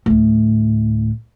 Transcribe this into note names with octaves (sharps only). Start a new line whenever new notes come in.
D2 A2